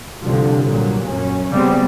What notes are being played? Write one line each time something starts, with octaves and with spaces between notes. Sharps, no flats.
C2 G2 D3 F3
G2 A#2 F#3
F#2 C#4
C#3 F#3 G3 B3 C4